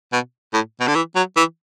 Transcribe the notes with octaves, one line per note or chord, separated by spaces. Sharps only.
B2
A2
B2
D3
E3
F#3
E3